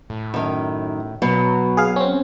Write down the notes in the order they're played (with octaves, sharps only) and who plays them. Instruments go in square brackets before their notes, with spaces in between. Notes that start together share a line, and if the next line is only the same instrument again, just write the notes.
[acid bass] A2
[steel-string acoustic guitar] F#2 D#3
[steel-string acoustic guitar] B2 [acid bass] F#3
[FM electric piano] G#4 F5
C4 C#4